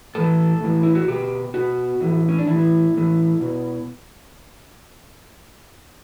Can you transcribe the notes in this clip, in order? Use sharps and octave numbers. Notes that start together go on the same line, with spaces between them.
A2 E3 A4
A2 E3
E4
F#4
B2 G4
B2 F#4
A2 E3
C#4
D4
A2 E3 E4
A2 E3
B2